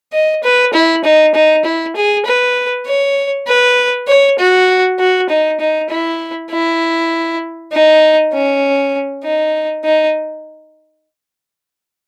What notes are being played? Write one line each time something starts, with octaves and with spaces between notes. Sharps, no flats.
D#5
B4
E4
D#4
D#4
E4
G#4
B4
C#5
B4
C#5
F#4
F#4
D#4
D#4
E4
E4
D#4
C#4
D#4
D#4